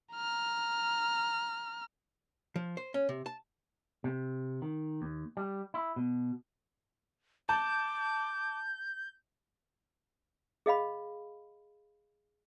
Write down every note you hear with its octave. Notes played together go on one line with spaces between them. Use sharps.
A#5 F6
F3
C5
C#4
C3
A5
C3
D#3
D#2
G3
E4
B2
A5 D6 G6
G#4 D#5 F5 B5